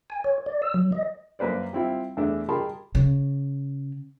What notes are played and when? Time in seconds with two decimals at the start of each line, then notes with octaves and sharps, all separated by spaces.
0.10 G#5
0.24 C#5
0.46 D5
0.62 E6
0.74 F#3
0.92 D#5
1.39 F#2 A#3 B4 C5 D5
1.73 G3 C4 E4 F4
2.17 E2 A3 D4 G#4 A4
2.49 G4 G#4 A#4 A5 B5 C6
2.95 C#3